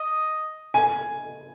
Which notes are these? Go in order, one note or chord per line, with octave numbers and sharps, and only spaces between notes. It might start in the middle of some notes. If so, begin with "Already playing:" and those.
Already playing: D#5
G#5